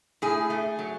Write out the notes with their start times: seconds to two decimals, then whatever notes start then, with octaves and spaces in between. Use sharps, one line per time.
0.22 A2 G#4
0.50 A3
0.79 F#3